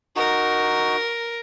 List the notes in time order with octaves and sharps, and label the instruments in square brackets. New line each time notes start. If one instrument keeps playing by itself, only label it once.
[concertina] D#4 F#4 [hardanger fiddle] A#4